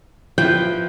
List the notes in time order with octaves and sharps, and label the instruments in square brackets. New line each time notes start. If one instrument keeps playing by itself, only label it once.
[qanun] F3 E4 B4 [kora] G5